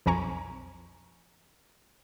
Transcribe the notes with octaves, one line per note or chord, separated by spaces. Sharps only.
B1 F2 F3 G#5 A#5 C#6